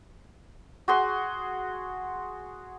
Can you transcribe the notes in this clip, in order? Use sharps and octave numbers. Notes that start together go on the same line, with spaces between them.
F#4 G#4 C6